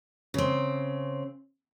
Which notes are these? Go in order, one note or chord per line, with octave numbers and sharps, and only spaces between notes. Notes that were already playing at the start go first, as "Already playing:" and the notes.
C#3 C4